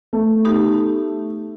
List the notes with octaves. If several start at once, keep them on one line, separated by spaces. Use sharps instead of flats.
A3
B3 D#4 G4